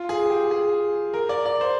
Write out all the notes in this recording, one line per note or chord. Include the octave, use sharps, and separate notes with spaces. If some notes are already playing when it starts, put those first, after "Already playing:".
Already playing: F4
G#4
G4
G#4
A#4
D5
D5
C5